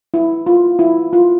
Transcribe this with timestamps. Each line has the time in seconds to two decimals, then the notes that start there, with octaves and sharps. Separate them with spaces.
0.14 E4
0.47 F4
0.79 E4
1.13 F4